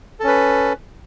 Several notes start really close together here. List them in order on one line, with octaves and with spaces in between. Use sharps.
A4 C#4 B4